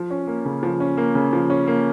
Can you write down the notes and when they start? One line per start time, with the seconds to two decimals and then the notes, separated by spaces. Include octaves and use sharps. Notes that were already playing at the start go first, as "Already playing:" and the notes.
Already playing: F3
0.10 C#4
0.27 A#3
0.45 C#3
0.63 F3
0.80 C#4
0.98 A#3
1.15 C#3
1.33 F3
1.50 C#4
1.67 A#3